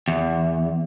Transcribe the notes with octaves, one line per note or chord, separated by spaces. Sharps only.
E2